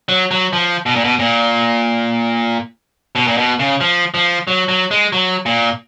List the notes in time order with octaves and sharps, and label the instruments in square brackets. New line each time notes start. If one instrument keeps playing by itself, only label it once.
[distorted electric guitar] F#3
F#3
F3
B2
A#2
B2
A#2
B2
A#2
B2
C#3
F3
F3
F#3
F#3
G#3
F#3
A#2